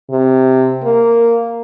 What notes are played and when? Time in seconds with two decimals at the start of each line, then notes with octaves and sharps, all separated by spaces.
0.11 C3
0.84 A#3